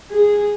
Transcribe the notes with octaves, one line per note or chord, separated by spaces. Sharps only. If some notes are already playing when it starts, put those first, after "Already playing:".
G#4